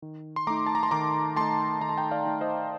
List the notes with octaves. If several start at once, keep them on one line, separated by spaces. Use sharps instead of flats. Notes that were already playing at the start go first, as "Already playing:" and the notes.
D#3
C6
A3 D#4 A#5 D6
A5
A#5
C6
D#3 A#5 D6
A3 D#4 A5 C6
D#3 A#5
A5
G5 A#5
D5 F5
A3 D#4
C5 D#5